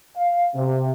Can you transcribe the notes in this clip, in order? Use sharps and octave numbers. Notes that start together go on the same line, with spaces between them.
F5
C3